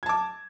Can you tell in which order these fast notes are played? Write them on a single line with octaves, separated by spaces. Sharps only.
G#6 A5 D6